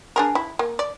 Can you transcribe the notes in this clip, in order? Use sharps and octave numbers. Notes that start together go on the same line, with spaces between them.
D4 G#4 A#4
E4
A#3
D5